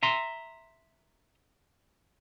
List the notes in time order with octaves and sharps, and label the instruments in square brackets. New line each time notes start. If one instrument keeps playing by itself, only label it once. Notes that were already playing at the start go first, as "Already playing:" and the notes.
[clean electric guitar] E5 A#5 C6